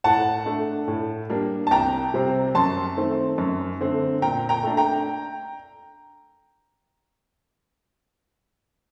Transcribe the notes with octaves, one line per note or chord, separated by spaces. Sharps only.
A2 F#5 A5
A3 D4
A2
G3 A#3 D4
A5
C2 G5 A#5
C3 G3 C4
F#2 A5 C6
D#3 A3 C4
F#2
D3 A3 C4
A#2 G5 A#5
G5 A#5
A3 D4
G5 A#5